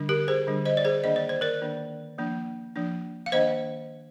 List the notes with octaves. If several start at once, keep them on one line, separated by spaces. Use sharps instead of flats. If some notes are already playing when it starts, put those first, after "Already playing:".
Already playing: D3 G3 D4
G4 A#4
G#4 C5
D3 G3 D4
C5 D#5
D5
G#4 C5
D#3 A#3 D4 D#5
D5
C5
A#4 D5
D#3 A#3 D4
F3 A#3 D4
F3 A#3 D4
F5
D#3 A#3 D4 C5 D#5